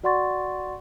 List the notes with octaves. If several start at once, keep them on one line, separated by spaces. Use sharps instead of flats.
F#4 D5 F#5 C6 C#6 A6